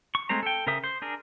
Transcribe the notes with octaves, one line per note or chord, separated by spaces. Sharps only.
C#6
G#3 A3 C4 C5 A#5
A4 G5
C#3 A#4 C5 E5 D#6
C5
D4 G#4 A#4